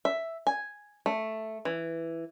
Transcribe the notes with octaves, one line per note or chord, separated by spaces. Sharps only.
E5
G#5
A3
E3